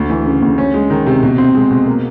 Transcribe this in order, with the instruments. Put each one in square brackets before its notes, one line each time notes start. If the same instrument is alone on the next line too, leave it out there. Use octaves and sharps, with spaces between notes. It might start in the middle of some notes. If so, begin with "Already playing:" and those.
Already playing: [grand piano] D2
E3
C#3
D2
C#4
G#3
D#3
C3
B2
C4
G#3
B2
A#3